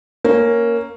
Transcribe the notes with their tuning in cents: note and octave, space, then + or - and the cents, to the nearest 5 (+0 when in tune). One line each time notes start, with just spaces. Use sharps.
A#3 +0 C#4 +0